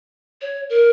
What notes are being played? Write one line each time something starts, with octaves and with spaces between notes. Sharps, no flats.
C#5
A#4